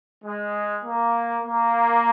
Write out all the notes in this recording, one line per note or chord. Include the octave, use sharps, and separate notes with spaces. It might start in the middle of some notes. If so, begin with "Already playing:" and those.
G#3
A#3
A#3